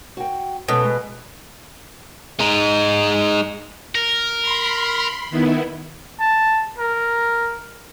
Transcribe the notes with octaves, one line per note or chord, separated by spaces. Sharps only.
F#4 G5
B2 G#3 C#4 A4
G#3
G#3 D#4
A#4
B5 C6
D#3 B3 E4
A5
A#4